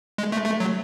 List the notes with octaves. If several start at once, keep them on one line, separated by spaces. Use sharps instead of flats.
G#3
A3
A3
F#3